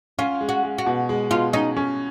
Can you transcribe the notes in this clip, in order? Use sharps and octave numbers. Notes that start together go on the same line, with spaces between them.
C#4 F4
G#3
F#4
G#3
F#4
B2
G#3
B2 F4
C#4 D#4
C#4